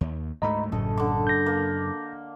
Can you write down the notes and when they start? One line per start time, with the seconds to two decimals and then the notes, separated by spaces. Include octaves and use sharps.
0.01 D#2
0.42 D2 G#2 A3 D#5 A#5 B5
0.72 G#1 F#2 A2 C#3 A4 D#5
0.98 D3 D6
1.27 G6 A#6
1.46 A#3